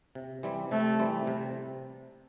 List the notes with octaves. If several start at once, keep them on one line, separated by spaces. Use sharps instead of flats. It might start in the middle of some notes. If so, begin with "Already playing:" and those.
C3
E3 G3 C4
C3 A3
E3 G3 C4
C3